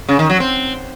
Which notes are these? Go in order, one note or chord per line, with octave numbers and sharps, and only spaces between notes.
C#3
D#3
F#3
C4